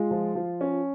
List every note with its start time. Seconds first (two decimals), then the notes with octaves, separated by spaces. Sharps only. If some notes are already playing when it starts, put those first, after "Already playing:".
Already playing: G#3 F4
0.11 F3
0.35 F3
0.61 C#4